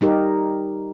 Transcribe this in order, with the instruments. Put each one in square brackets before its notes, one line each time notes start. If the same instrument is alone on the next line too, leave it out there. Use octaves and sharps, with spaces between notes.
[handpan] G3 D#4 G4 A#4